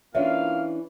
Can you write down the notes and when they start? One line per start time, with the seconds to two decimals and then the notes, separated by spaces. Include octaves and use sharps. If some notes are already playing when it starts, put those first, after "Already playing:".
0.15 E3 A#3 C#4 D4 F4 E5 F5